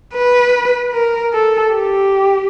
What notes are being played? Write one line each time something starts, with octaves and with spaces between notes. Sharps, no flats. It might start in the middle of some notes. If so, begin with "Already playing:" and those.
B4
A#4
A4
G4